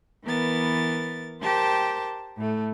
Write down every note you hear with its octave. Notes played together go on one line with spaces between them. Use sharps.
E3 B3 A#4 A6
G4 A#4 C5 G5 A5
A2 A3